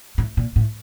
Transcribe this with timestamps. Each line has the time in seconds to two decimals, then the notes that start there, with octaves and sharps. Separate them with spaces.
0.18 A2
0.37 A#2
0.56 A2